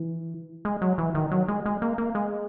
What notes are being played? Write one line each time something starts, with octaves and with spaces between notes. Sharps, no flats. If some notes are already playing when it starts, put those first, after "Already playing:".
Already playing: E3
G#3
F#3
E3
D#3
F#3
G#3
G#3
A#3
A#3
G#3